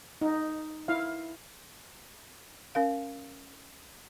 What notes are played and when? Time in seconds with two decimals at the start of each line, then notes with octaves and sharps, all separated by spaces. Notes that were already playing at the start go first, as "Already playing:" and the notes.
0.21 D#4
0.88 E4 F5
2.75 C#4 A#4 F5